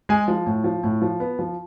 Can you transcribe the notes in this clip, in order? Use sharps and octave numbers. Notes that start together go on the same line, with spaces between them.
G#3 G#5
F3
A2
F3
A2
F3
B3
F3